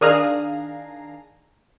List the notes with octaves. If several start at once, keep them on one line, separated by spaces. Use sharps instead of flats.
D#3 D4 G#4 F5 A#5